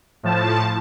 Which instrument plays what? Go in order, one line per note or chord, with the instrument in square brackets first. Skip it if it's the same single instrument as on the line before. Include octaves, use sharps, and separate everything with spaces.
[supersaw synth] A2 F3 A5